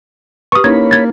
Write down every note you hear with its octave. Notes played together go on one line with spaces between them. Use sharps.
G4 B4 C#6 D#6
A#3 C#4 D#4 E4 C#5 B5 G#6
G#6 A6